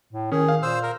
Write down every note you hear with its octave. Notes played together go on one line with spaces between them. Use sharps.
A2
D#3 C#4 G#4
F5
A#2 C5 E6
A#4